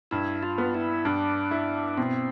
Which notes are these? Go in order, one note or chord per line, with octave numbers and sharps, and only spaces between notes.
G2 E4
F4
B3
E4
G2 D4
E4
B2 C4